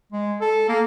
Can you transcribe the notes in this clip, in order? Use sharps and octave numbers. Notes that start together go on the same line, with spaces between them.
G#3
A4
A#3